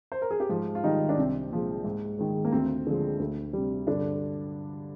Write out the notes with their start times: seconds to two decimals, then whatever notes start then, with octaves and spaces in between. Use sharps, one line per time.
0.12 C5
0.22 A#4
0.31 G#4
0.40 G4
0.49 G#2 F3 F4
0.75 F4
0.84 D#3 G3 D#4
1.09 D4
1.18 C2 C4
1.51 A#2 F3 G#3
1.85 G#2
2.19 D#3 G#3
2.45 A#3
2.52 D2 C4
2.87 D3 F3 G#3
3.20 D2
3.53 C3 G3
3.87 G2 D3 D4